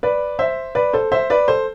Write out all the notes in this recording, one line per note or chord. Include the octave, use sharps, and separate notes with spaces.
B4 D5
C5 E5
B4 D5
A4 C5
C5 E5
B4 D5
A4 C5